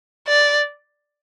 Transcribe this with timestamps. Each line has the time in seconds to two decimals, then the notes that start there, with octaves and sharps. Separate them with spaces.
0.28 D5